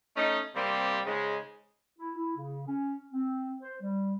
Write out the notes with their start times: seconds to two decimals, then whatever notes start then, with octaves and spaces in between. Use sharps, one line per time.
0.16 A3 C#4 D#4
0.55 C3 G3 A#3 C4 G4
1.06 G#2 C#3 G#3
1.99 E4
2.16 E4
2.37 C#3
2.67 C#4
3.13 C4
3.62 C5
3.82 G3